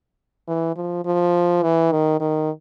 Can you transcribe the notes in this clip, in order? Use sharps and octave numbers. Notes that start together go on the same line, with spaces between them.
E3
F3
F3
E3
D#3
D#3